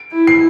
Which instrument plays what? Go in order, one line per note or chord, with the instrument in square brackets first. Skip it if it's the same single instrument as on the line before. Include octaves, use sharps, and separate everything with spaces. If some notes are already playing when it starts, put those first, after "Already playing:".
Already playing: [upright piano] D7
[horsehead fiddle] E4
[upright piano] C7